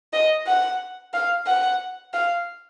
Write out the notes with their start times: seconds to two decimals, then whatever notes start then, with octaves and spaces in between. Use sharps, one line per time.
0.13 D#5
0.46 F#5
1.13 F5
1.47 F#5
2.13 F5